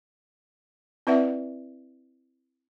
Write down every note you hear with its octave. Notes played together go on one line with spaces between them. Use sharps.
C4 E4 B4 D5 E5 F#5